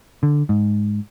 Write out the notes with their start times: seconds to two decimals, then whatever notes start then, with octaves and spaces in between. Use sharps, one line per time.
0.23 D3
0.49 G#2